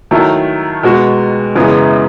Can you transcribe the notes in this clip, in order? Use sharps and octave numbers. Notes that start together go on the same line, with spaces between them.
D#3 F#3 A3 E4
B2 G#3 B3 F#4
F#2 C#3 E3 G#3 B3